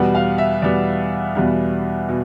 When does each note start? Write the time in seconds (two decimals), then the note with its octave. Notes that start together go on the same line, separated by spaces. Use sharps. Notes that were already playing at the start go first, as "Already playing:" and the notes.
Already playing: E2 B2 G3 B3
0.15 F5
0.38 E5
0.62 E2 B2 G3 B3 D5
1.35 E2 B2 G3 B3
2.09 B2